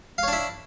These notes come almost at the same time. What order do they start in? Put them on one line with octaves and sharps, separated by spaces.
F5 C#5 D4 E4